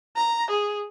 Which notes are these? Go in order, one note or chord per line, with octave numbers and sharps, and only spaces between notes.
A#5
G#4